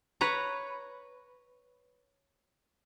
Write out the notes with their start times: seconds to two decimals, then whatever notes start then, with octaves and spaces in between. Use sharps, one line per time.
0.21 B4 C#5 A#5